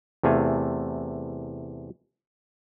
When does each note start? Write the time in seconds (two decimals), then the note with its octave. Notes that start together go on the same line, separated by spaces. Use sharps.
0.23 E2 C3 A3 F5 G#5